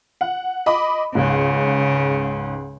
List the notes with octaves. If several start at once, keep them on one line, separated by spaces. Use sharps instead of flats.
F#5
D#5 B5 D6
C#2 G#2 C#3